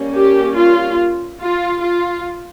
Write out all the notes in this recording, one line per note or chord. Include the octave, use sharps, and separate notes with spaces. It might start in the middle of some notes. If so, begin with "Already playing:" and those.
Already playing: G3 A#3 C#4
G4
F4
F4
F4